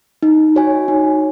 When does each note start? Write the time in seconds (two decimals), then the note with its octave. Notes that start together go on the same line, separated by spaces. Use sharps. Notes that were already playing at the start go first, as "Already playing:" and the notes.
0.23 D#4
0.56 F#4 C#5 G#5
0.88 D#4